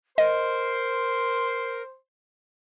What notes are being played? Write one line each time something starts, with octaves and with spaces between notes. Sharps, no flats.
A#4 C5 D#5 C6